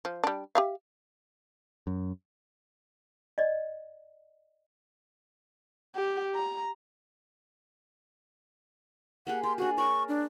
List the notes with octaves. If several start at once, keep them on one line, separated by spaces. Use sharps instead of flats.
F3
G3 D4
G4 E5 F5
F#2
D5 D#5
G4
A#5
A#3 G4 G#4 F#5
G4 C6
D4 F#4 G#4
A#4 C#5 D5 C#6
D4